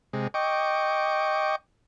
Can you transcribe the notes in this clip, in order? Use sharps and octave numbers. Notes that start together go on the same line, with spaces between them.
C3 G#3
D#5 G5 C#6 D6